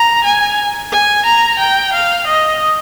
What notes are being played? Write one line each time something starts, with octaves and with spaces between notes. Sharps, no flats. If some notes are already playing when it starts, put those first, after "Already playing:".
Already playing: A#5
G#5
G#5
A#5
G5
F5
D#5